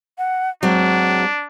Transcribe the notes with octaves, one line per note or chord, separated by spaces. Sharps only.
F#5
F#3 G#3 C4 D4 F#5